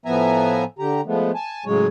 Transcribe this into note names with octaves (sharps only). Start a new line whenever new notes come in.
A2 F3 B3 E5 G#5 A#5
D3 G4 A#5
F3 G#3 A3 B3
G#5 A5
A2 C#3 F#3 G#3 C#5